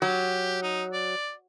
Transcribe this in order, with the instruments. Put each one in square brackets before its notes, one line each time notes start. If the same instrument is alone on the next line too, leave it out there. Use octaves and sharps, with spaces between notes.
[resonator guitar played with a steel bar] F#3 [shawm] G4
[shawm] D#4
D5